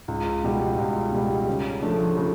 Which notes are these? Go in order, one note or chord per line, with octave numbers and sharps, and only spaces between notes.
C#2
B2 G3
C#2
B2 G3
C#3
F3 A3 D4
C#3